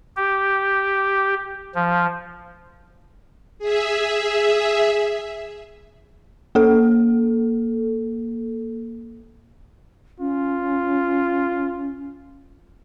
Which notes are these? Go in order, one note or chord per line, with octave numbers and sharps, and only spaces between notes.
G4
F3
G#4 E5
A#3 A4
C#4 F4